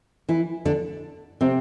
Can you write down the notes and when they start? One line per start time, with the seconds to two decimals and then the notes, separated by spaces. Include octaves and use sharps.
0.29 E3 E4
0.65 D3 D4
1.41 C3 C4